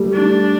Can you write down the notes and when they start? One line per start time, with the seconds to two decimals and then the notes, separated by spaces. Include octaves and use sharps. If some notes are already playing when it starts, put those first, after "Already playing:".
Already playing: G3 A3
0.13 D4